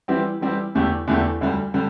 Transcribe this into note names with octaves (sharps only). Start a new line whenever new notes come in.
E3 G3 C4 E4 G4
E3 G3 C4 E4 G4
E2 D3 A3 E4 G4
E2 D3 A3 E4 G4
D2 D3 G3
D3 G3